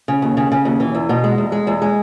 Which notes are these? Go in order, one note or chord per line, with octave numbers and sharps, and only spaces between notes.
C#3
D#2
C#3
C#3
D#2
E3
E2
B2
G#3
E2
G#3
E2
G#3